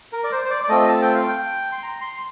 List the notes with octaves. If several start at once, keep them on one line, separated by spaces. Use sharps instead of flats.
A#4
D5
C5
C5
D5
D5
A3 C4 F4 D#5
A5
G5
F5
G5
C6
A#5
C6